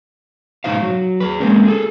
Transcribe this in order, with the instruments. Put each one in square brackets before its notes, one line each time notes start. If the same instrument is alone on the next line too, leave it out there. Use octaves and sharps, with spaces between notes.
[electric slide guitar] G#2 B2 G3 D#4 C5 F5
F#3
G#4 B4
G#3 A#3 C4 C#4
G#4 A4